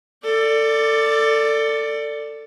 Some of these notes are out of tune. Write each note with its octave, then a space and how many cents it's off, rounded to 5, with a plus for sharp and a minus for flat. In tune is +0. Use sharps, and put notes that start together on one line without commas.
A4 +25 D5 +0